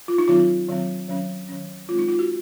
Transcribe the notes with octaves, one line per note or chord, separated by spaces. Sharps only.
F4
D#4
D#3 F#3 C4 F4
D#3 F#3 C4
D#3 F#3 C#4
D#3 F#3 C#4
D#3 G#3 C4 F4
D#4
F4
F#4